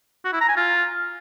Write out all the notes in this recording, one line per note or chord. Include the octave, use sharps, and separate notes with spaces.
F#4
E4
A#5
G#5
F4